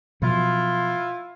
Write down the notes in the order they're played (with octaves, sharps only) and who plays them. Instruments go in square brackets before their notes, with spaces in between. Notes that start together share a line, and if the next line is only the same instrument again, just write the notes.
[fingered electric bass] B2 F3 F#3 [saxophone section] E4 F4